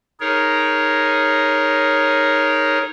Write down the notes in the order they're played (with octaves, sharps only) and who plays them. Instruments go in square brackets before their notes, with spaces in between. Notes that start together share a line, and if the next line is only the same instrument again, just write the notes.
[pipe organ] D#4 G#4 A#4 C#5